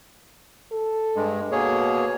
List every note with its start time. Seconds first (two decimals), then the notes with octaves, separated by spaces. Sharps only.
0.73 A4
1.16 G2 G#3
1.52 B2 A#3 G#4 C#5